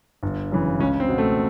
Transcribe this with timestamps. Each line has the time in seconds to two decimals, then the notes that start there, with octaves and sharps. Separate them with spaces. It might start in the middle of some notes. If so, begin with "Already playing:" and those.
0.23 G1
0.51 F#2 C#3 E3
0.80 C#2 C#4
1.00 C4
1.09 B2
1.18 A3